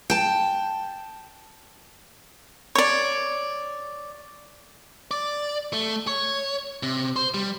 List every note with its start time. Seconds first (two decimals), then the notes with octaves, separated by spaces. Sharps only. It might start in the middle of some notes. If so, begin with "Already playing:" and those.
0.10 G5 A5
2.75 C#5 D5
5.11 D5
5.73 A3
6.07 C#5
6.83 C3
7.16 C5
7.34 G3